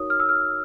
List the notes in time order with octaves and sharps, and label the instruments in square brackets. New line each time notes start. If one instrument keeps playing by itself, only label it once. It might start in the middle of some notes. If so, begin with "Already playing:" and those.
Already playing: [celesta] D#4 F#4 A#4 C#5 D#6
F6
E6
F6